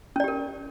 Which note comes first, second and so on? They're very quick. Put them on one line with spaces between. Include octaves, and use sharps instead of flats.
C#4 D5 G4 A#4